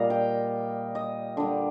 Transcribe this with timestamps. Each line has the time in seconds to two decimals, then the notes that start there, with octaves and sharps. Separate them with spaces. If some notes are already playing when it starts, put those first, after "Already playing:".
Already playing: A#2 G3 D#5 F5 A#5
0.10 G5
0.95 D#5
1.37 D3 G3